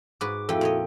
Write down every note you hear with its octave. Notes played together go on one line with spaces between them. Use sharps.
G#2 F#4 B4 D6
F2 A3 E4 F#4 A4 E5 G5
A#2 C#5 D#5